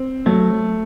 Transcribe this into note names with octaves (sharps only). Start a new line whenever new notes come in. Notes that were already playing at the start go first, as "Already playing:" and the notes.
Already playing: C4
F#3 A3